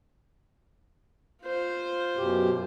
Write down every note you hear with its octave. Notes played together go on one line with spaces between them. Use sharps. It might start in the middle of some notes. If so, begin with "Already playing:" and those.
F4 C5
F#2 B2 G4